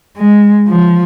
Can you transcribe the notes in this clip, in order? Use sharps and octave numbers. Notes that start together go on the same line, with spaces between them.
G#3
F3